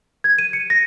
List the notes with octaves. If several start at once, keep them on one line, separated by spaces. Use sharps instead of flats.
G#6
D#7
C#7
A#6